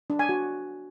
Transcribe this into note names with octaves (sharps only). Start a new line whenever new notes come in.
D4
G#5
F#4